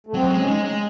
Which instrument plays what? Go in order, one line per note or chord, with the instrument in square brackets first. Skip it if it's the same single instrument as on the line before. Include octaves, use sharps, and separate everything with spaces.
[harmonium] A3
[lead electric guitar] F#3 [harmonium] C4
[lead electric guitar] G#3
[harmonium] C#4
[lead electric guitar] G#3 [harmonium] D#4
[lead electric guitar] G#3